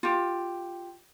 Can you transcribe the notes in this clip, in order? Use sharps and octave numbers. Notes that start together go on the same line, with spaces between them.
F4 G4